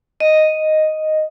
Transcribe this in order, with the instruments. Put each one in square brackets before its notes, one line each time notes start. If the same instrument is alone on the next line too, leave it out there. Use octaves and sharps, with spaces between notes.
[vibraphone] D#5